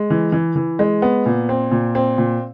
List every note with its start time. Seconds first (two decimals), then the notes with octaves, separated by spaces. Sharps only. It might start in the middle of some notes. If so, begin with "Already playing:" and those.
Already playing: G#3
0.10 E3
0.32 E3
0.56 E3
0.79 G#3
1.02 B3
1.26 A#2
1.49 C4
1.71 A#2
1.95 C4
2.18 A#2